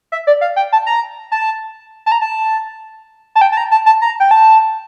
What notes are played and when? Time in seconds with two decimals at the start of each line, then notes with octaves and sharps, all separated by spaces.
0.12 E5
0.27 D5
0.41 F5
0.56 G5
0.72 A5
0.86 A#5
1.32 A5
2.06 A5
2.12 A#5
2.21 A5
3.35 A5
3.41 G5
3.52 A5
3.57 A#5
3.71 A5
3.86 A5
4.02 A#5
4.20 G5
4.31 A5